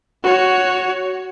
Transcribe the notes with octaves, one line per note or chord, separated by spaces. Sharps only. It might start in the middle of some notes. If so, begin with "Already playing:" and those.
F#4 C#5